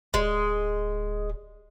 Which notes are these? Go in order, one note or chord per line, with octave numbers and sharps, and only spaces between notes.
D1 G#3